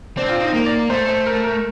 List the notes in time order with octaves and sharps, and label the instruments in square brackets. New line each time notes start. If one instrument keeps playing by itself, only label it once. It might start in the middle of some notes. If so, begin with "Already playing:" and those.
[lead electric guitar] C4 [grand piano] D4
[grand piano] F4
D#4
[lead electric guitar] A#3
[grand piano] D5
[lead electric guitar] A3 [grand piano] C5
[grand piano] C5
A#4
A#4